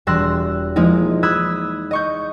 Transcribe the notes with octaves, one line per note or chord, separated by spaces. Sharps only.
E1 G3 C6 E6 F#6 A#6
F3 G#3 A#3 D#4 E4
B5 D#6 E6 F#6 G#6 B6
D#5 C#6 G6